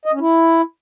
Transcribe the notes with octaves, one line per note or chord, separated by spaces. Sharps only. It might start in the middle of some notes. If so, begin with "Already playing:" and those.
D#5
C#4
E4